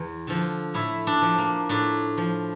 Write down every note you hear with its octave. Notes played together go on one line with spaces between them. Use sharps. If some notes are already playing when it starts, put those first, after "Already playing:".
Already playing: E2
D3 F3
A2 E4
D4
F3
A#3
A2 D4
F3